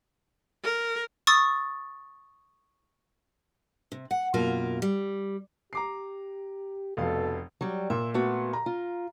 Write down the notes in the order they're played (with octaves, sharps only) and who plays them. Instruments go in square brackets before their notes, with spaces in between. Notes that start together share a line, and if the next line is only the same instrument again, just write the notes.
[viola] A#4
[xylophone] C#6 D#6 E6 A6
[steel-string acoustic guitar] C3
F#5
F#2 B2 A#3 F4 A#4
G3
[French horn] G4 [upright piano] A#5 D6 C7
[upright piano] F1 F2 F5 [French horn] B2 [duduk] A4
[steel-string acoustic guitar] F#3 G3
[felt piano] A#2 [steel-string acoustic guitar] E5
[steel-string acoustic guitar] A3 B3 F#4
[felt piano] A#5
[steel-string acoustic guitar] F4